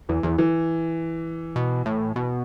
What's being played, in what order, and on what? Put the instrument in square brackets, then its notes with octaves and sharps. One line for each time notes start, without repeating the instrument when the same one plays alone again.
[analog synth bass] E2 [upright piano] E3
[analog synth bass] E2 [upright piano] E3
[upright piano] E3
[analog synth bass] B2
A2
B2